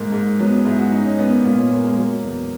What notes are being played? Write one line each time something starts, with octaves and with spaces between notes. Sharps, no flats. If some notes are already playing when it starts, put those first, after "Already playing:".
Already playing: G#2 A#3
G#2
F#3 B3
C#4
G#2 E4
F#4
F#2 D#4
C#4
F#2 B3
A#3
A#2 B3
C#4
A#2 A#3
G#3
F#3 A#3
E2